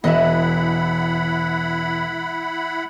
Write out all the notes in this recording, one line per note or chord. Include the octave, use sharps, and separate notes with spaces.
E1 E4 D#5 E5 F#5 B5